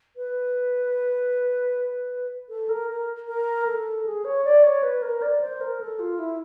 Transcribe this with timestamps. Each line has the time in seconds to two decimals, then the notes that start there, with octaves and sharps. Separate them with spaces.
0.16 B4
2.49 A4
2.69 A#4
2.89 A#4
3.27 A#4
3.67 A4
4.06 G#4
4.24 C#5
4.45 D5
4.64 C#5
4.83 B4
5.02 A#4
5.22 D5
5.41 C5
5.61 A#4
5.81 A4
5.99 F4
6.19 E4